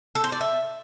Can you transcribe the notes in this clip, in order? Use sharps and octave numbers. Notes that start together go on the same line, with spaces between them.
A4
C5
D5
E5